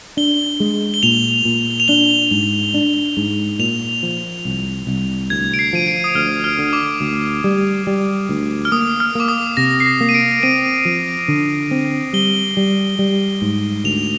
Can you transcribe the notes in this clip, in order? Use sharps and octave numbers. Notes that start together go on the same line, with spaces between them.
D4 G7
G#3
G7
A#2 F7
A#2
F7
D4 G7
G#2
D4
G#2
A#2 F7
F3
C2
C2
D2 G#6
D7
C7
F3 D#7
D7
D#6
D2 F6
F6
D3
D6
D2
G3
G3
D2
F6
A#3 D#6
F6
A#3 D6
D#6
C3 A#6
C7
A#6
A#3
D#7
D7
C4 D#7
F3
D3
C4
G3 G7
G3
G3
G#2
D2 F7